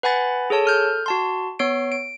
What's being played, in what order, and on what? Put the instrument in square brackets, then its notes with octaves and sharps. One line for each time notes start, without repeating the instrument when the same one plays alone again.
[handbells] B4 F#5 G#5 B5 A6
G#4 A4 C#5 A5
A4 F6 G6
F#4 A5 C6
B3 C#5 C7 D7
D7